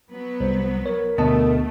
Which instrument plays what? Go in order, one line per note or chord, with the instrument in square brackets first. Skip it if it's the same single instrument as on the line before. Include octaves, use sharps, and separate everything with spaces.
[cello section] F#3 B3 B4
[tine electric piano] C2 [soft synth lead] C5
[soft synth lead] A#4 [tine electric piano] C#5
[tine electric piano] D2 D#5 A5 [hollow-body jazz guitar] B2 [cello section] A3